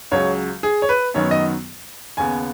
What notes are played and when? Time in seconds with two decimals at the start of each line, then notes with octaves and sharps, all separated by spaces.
0.11 C#2 C#3 F#3 C#5
0.63 G#4
0.82 C#5
0.89 B4
1.14 F#2 D#3 F#3 B3 C#5
1.31 D#5
2.17 D#2 C#3 B3 G#5